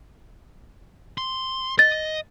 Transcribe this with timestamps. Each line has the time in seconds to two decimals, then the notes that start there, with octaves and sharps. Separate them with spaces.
1.18 C6
1.79 D#5 A6